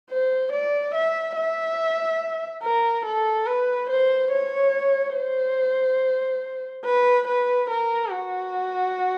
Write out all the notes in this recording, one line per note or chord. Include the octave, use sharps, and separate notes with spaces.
C5
D5
E5
E5
A#4
A4
B4
C5
C#5
C5
B4
B4
A#4
F#4